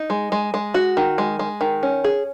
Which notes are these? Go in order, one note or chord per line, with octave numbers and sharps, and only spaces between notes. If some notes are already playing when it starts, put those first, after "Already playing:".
Already playing: D#4
G#3
G#3
G#3
F#4
D#3
G#3
G#3
D#3
C#4
G#4